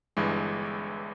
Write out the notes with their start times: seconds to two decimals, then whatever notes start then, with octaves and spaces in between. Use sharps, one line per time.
0.17 G1 G2 E3 G#3